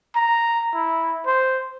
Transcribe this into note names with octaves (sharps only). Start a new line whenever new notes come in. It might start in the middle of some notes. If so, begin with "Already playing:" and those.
A#5
E4
C5